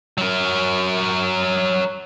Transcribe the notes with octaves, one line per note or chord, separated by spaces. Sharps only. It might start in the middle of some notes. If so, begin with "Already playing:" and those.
F#3 A#4